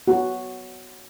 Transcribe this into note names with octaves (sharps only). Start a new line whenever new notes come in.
F#4